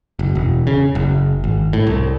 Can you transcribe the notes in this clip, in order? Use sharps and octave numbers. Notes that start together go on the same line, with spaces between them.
F#1
E1
C#3
F#1
G#1
A2
C2